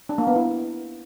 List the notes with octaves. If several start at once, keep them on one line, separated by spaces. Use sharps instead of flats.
D4
A#3
B3
E4